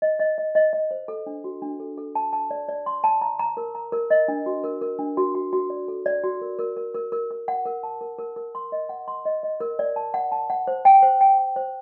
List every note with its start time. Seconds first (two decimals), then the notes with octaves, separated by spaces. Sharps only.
0.02 D#5
0.19 D#5
0.38 D#5
0.55 D#5
0.73 D#5
0.91 C5
1.08 A4
1.26 D4
1.44 F#4
1.62 D4
1.80 A4
1.97 A4
2.15 A5
2.33 A5
2.51 D5
2.68 D5
2.86 C6
3.04 A5
3.21 A#5
3.39 A#5
3.57 A#4
3.75 A#5
3.92 A#4
4.10 D#5
4.28 D4
4.46 F#4
4.64 A#4
4.81 A#4
4.99 D4
5.17 F#4
5.35 F#4
5.53 F#4
5.70 D5
5.88 A4
6.06 D5
6.24 F#4
6.41 A#4
6.59 A#4
6.77 A#4
6.95 A#4
7.12 A#4
7.31 A#4
7.48 F#5
7.66 A#4
7.83 A5
8.01 A#4
8.18 A#4
8.36 A#4
8.55 C6
8.72 D#5
8.89 F#5
9.08 C6
9.25 D#5
9.43 D#5
9.60 A#4
9.79 D5
9.96 A5
10.14 F#5
10.32 A5
10.50 F#5
10.67 C5
10.85 G5
11.03 C5
11.21 G5
11.38 G5
11.56 C5